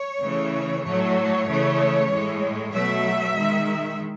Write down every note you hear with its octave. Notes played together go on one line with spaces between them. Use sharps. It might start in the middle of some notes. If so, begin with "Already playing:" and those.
Already playing: C#5
C#3 E3 A3
A2 F#3 A3 C#5
C#3 E3 A3
A2 G#3
B2 F#3 A3 E5
D#3 G#3